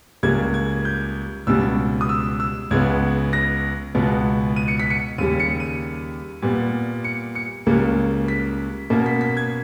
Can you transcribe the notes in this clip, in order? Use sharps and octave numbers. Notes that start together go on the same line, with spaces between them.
C#2 C#3 G3 A#3 G#6
G#6
G6
C#2 B2 G3 C#4 E6
D#6
E6
E6
C#2 C#3 G#3 B3 G#6
A#6
C#2 B2 G#3 B3
D#7
C#7
B6
C#7
D#2 C#3 G3 D#7
C#7
D#7
A#2 G3 B3
C#7
C#7
C#2 C#3 G3 A#3 C#4
B6
B2 A#3 C#4
B6
B6
G#6